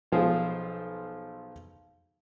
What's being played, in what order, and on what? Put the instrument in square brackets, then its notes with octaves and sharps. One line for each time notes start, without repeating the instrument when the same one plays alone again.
[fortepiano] B1 F3 G#4 C5